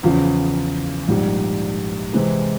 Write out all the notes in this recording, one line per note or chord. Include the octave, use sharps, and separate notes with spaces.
E2 C#3 F3
A#1 G#2 G3
C3 E3 G#3 C4 E4